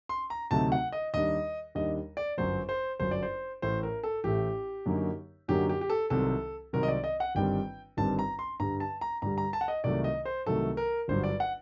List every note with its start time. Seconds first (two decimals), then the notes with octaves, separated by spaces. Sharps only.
0.09 C6
0.30 A#5
0.51 D2 C3 F#3 A3 D#4 A5
0.72 F#5
0.92 D#5
1.14 D#2 D#3 G3 D4 D#5
1.75 D#2 D#3 G3 D4 D#5
2.17 D5
2.38 G1 F#2 F#3 C5
2.69 C5
3.00 G1 F#2 F#3 C5
3.11 D5
3.23 C5
3.62 A1 A2 A3 C5
3.83 A#4
4.03 A4
4.24 A1 A2 A3 G4
4.86 F#2 D3 F#3 A#3 D#4
5.48 F#2 D3 F#3 A#3 D#4 G4
5.69 G4
5.81 G4
5.90 A4
6.10 C2 C3 D#3 F#3 C4 A4
6.73 C2 C3 D#3 F#3 C4 A#4
6.83 D#5
6.88 D5
7.04 D#5
7.20 F#5
7.35 G1 G2 D#3 G3 C4 G5
7.97 G1 G2 D#3 G3 C4 A5
8.19 A#5
8.39 C6
8.60 G2 D3 G3 A#5
8.80 A5
9.01 A#5
9.22 G2 D3 G3 A#5
9.38 A#5
9.53 A5
9.61 F#5
9.68 D#5
9.84 C2 C3 D#3 F#3 A3 D5
10.04 D#5
10.25 C5
10.46 C2 C3 D#3 F#3 A3 A4
10.77 A#4
11.08 G1 G2 D3 F#3 C5
11.23 D5
11.40 F#5